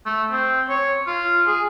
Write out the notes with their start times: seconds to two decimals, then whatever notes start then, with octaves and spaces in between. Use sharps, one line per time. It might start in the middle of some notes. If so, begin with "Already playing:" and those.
0.06 A3
0.31 C4
0.69 C#5
1.07 F4
1.47 G#4